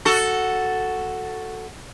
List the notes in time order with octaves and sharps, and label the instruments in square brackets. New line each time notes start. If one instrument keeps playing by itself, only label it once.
[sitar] F#4 A4